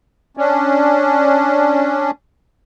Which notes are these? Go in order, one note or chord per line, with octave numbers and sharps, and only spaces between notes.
C#4 D4